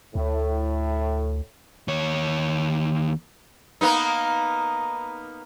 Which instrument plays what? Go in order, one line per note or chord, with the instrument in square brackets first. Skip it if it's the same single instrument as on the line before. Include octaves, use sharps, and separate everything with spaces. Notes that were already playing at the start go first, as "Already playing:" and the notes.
[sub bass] D2 [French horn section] A2
[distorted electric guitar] D#2 C#5
[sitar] A#3 B3 D#4